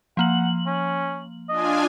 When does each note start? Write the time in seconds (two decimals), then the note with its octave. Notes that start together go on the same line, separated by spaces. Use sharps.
0.17 F3 A#3 F#5 F#7
0.67 C#4
1.49 D4 F4 D#5 G#5